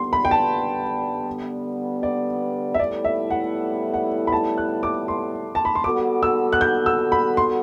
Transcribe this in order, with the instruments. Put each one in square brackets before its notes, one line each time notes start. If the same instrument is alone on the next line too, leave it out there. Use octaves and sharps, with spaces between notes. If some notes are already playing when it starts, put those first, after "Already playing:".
Already playing: [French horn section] D3 G3 B3 [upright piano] C6
[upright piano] B5
G5
A5
D5
E5
[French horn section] A2 G3 B3 E4 A4 [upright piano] D5
[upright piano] E5
F#5
F#5
B5
A5
F#6
D6
C6
A5
B5
C6
[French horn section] G3 B3 F#4 A4 [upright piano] D6
[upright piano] E6
F#6
G6
E6
B5
C6